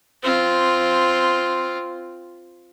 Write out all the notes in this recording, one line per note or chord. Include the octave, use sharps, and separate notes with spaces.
C4 F4